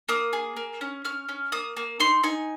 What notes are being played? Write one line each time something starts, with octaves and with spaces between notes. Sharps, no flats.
A#3 D#6
G#4
A#3
C#4
C#4 F6
C#4
A#3 D#6
A#3
D#4 C6
D#4 G#5